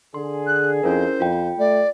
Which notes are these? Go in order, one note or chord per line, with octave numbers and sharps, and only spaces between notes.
D3 G#4 C6
F#6
F2 C#4 E4 A#4 C5
F2 F4 G5
A3 D5